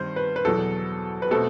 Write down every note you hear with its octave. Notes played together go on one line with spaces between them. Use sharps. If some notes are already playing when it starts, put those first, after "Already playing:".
Already playing: G2 D#3 C4 C5
B4
B4
E2 B2 F#3 A4
B4
B2 A3 C4 A4